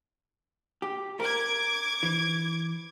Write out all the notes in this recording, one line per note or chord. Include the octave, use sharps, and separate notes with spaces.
G4
A#4 D6 G#6
E3